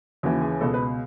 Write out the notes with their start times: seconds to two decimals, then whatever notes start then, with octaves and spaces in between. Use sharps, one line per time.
0.23 D#2 C#3 E3 F#4
0.41 G#4
0.61 C#2 B2 A4
0.74 B4